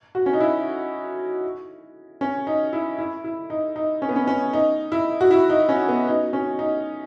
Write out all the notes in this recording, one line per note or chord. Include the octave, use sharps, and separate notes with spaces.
F#4
C#4
D#4
E4
C#4
D#4
E4
E4
E4
D#4
D#4
C#4
B3
C#4
C#4
D#4
E4
F#4
E4
D#4
C#4
B3
D#4
C#4
D#4